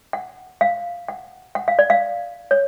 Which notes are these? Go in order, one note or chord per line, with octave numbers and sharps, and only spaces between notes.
F#5
F5
F#5
F#5
F5
D5
F5
C#5